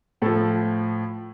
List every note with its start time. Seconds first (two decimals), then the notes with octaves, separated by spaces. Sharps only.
0.22 A2 F3 A4